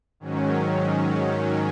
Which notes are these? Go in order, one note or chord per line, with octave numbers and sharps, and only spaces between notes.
G#2 D#3 F#3 C#4